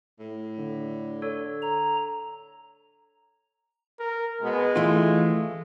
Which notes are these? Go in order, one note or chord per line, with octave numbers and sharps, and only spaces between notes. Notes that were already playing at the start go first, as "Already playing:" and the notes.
A2
D3
A4 C#5
A#5
A#4
B2 G#3 B3
E3 A3 F4